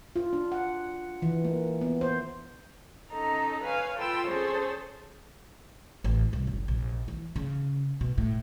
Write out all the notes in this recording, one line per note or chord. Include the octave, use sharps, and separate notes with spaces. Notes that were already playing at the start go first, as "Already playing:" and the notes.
F4
D4
F#5
E3
A#3
B3
C5
C#4 D#4 A4 A#5
B4 C#5 F5 G#5
F4 A4 B4 G5 E6
C#4 G#4 A4 C5 C#5
A1
C2
F#1
A#1
E3
C#3
B2
A2